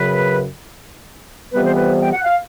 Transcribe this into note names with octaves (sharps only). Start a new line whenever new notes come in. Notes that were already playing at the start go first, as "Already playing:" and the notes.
Already playing: F#2 C#3 F#3 B4
F2 C3 E3 G3 B3 B4
C5
B4
G5
F#5
F5